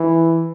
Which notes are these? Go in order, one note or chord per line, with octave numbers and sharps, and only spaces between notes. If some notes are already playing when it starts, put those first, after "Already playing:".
Already playing: E3